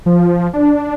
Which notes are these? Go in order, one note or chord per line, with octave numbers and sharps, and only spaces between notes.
F3
D4